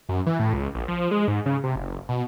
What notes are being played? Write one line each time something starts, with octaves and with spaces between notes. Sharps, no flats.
F#2
E3
A2
C#2
A#1
F3
G#3
G#2
C#3
C3
F#1
B2